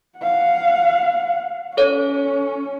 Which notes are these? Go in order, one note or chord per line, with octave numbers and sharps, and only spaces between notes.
F5 F#5
C#4 A4 C#5